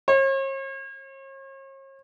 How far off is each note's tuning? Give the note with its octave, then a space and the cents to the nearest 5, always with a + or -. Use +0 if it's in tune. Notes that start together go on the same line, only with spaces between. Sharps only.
C#5 -45